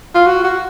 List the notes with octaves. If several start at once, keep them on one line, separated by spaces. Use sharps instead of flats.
F4
F#4
F#4